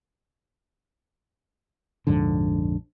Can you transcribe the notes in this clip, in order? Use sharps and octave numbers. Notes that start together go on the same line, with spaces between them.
A#1 F2 G#2 D3